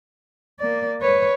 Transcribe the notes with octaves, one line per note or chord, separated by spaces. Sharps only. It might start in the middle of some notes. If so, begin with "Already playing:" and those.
A#3 D5
B4 C#5